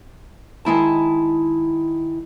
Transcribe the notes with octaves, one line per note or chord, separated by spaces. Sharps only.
D#3 G#3 E4 A5